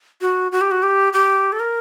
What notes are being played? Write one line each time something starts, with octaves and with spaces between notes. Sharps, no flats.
F#4
F#4
G4
F#4
G4
G4
A4
A#4